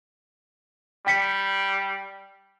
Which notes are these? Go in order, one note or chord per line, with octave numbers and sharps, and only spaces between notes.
G3 G5 B6 C#7